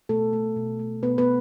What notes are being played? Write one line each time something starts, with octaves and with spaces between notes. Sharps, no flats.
B2 A3 A4
A3
B2
A3
B2 B3 B4
B3 B4